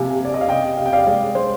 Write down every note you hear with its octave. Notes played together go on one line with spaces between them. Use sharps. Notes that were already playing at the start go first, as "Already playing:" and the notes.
Already playing: C3 F3 A#3 F5 G#5
C3 D5
D#5
F5
C3 D#5 G5
C3 F5
G5
D5 F5
G#3 D5
G#3 C5